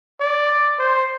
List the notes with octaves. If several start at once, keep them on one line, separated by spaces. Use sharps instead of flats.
D5
C5